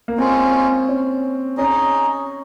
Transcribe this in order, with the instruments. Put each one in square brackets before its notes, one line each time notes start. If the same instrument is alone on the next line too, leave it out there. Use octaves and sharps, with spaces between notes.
[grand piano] A#3
[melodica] G#3 C#4 F4 [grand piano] C4
[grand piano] C#4
[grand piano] C#4 [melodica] D#4 G#4 D#5